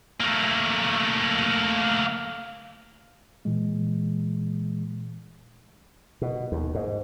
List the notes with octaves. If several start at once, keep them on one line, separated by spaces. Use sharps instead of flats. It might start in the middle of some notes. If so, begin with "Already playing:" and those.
A3 A#3
A#2 E3 G#3
B2
D#2
G#2